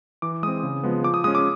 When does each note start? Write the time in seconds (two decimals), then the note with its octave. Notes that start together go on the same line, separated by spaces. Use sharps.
0.22 E3 D6
0.43 G#3 C4 D#6
0.63 C#3
0.83 F3 G#3 B3
1.04 F3 D6
1.14 D#6
1.24 G#3 C#4 D#6
1.35 D6